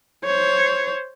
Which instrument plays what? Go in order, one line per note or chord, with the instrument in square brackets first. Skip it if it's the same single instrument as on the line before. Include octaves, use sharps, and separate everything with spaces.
[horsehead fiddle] C5 C#5